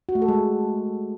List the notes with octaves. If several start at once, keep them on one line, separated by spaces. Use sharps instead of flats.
F#4
A3
A4
G#3